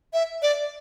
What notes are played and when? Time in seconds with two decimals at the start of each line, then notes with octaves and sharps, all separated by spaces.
0.13 E5
0.42 D5